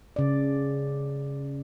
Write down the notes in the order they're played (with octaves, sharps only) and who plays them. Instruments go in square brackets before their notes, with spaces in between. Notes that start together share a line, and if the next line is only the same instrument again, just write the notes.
[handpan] C#3 D5